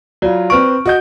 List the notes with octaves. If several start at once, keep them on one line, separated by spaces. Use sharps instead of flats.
F#3 F4 F#4 D5
C4 B4 C#6 F6 D7
F#4 D#5 G6